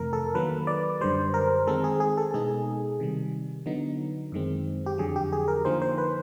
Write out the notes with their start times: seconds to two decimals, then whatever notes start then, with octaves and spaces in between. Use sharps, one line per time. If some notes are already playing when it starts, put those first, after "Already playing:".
Already playing: F2 C3 E3 A3 A#4
0.13 A4
0.35 D#3 F#3 A#3 B4
0.67 D5
1.01 F#2 D3 G3 C5
1.34 A#4
1.67 D#3 G#3 C4 A4
1.84 G#4
2.00 G#4
2.18 A4
2.34 B2 G#3 B3 D#4 G#4
3.00 C3 D#3 G3
3.66 D3 F#3 B3 D#4
4.32 F#2 D#3 G#3 C4
4.86 G4
4.98 F2 D3 F#3 G#4
5.16 G4
5.32 G#4
5.48 A#4
5.65 D3 F3 A#3 D#4 C5
5.82 C5
5.98 B4